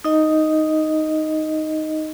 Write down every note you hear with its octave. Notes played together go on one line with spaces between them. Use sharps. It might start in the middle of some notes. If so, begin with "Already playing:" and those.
D#4 D#5